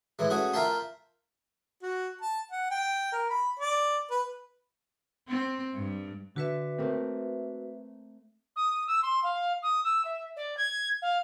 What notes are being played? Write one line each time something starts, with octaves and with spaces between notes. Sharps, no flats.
A2 E3 G#3
A3 C#4 F#4 G#4
F4 A#4 E5 G5 A5 C6
F#4
A5
F#5
G5
A#4
B5
D5
B4
C4
G2
D3 F#4 B4 E5
A3 A#3 C4
D#6
E6
C6
F5
D#6
E6
E5
D5
G#6
F5